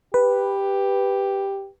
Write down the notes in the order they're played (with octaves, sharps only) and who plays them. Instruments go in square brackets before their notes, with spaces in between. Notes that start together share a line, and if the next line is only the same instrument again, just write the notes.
[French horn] G4 [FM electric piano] B4